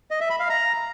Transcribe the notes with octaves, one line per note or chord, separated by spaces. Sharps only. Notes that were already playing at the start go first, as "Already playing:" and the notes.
D#5
E5
B5
F5
A#5